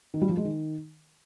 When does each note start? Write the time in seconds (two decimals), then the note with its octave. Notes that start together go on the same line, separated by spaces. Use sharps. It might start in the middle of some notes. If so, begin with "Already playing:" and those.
0.14 D#3
0.22 G3
0.29 F3
0.37 G#3
0.45 D#3